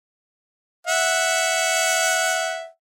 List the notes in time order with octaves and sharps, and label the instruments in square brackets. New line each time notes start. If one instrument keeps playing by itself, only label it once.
[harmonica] E5 F#5